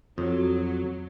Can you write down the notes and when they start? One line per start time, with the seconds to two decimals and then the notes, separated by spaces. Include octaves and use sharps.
0.18 F2 F#3